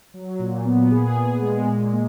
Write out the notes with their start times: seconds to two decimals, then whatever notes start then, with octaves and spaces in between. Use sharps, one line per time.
0.14 F#3
0.39 A#2
0.65 B3
0.91 G#4
1.17 G#4
1.42 G#3
1.68 A#2
1.93 A#3